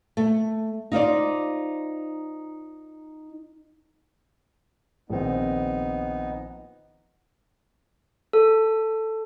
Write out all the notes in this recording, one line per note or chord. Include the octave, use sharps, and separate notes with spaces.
A3
D#4 F4 C5 D5
A#1 D#3 B3 C4 D#4
A4